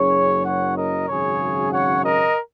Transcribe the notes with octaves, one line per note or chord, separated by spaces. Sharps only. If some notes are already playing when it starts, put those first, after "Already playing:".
Already playing: F#1 F#2 F#3 C#4 G#4 C#5
C#5 F#5
A#4 D#5
G#1 F#2 C#3 F#3 C#4 G#4 C#5
C#5 F#5
A#4 D#5